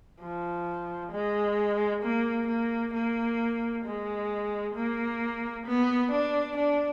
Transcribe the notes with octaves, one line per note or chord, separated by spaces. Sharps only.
F3
G#3
A#3
A#3
A#3
G#3
A#3
B3
D4
D4